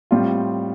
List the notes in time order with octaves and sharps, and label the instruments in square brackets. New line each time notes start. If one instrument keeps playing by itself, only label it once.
[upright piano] A2 G3 C4 F4